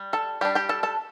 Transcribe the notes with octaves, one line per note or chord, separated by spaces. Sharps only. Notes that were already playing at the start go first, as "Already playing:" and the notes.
Already playing: G3
A4 A5
G3 D4 G4 G5
G4 G5
A4 A5
A4 A5